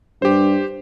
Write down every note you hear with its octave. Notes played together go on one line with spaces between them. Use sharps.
G2 G4 C5